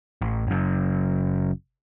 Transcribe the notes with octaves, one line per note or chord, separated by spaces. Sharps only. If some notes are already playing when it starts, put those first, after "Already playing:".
A1
F#1 F#2